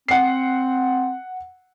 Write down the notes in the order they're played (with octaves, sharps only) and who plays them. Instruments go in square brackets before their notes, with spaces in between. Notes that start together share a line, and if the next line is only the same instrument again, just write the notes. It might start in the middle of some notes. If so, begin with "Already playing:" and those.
[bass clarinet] C4 [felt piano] F#5 C7